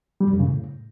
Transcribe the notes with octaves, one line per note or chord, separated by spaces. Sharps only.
G3
G2
F#2
C#3
A2